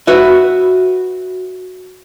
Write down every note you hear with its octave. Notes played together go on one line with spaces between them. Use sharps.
F#4 B4 E5